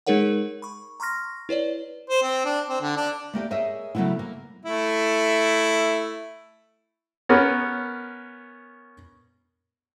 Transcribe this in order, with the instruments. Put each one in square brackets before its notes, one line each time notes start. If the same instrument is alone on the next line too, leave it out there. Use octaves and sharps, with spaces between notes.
[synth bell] G#3 D#4 G#4 A#4 C#5 F#5
B5 C#6
A#5 C6 C#6 F6 A#6
E4 B4 C#5 D5
[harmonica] C5
C4
D4
C4
D3
D4
[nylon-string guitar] A3 A#3 G4 D5
G#4 A#4 C#5 D#5 E5
C#3 F#3 G#3 A3 B3 E4
A#3
[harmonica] A3 E4
[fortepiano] B3 C#4 A#4